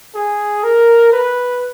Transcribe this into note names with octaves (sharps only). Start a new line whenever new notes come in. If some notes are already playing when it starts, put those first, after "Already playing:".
G#4
A#4
B4